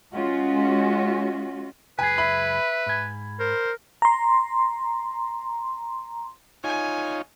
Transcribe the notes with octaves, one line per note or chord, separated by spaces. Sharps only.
G#3 C#4 F4 F#4
C#2 F#2 G#4 B4 G#5
E5 B5
G#2 G#5
A#4 C5
A#5 C6
D#4 F4 C#5 G#5